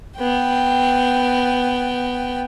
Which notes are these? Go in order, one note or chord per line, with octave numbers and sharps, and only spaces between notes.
B3 G5